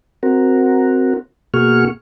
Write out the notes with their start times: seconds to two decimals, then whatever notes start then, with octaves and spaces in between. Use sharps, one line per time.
0.23 C4 F#4 A#4
1.54 B2 A#3 F#4 G#4 C#6 F6